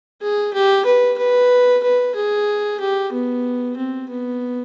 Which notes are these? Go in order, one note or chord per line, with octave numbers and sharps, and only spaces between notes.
G#4
G4
B4
B4
B4
G#4
G4
B3
C4
B3